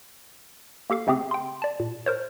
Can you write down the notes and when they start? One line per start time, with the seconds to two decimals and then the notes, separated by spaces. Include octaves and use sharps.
0.90 A#3 G4 A4 F5
1.07 C#3 A3 C4 G4 G#4
1.31 G5 C6
1.62 D5 A5
1.80 A#2
2.06 A#4 C5 C#5